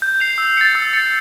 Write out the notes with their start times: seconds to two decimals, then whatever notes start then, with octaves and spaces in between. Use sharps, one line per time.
0.02 G6
0.20 C7 F7
0.38 E6
0.57 A6 C#7
0.75 E6
0.93 A6 C#7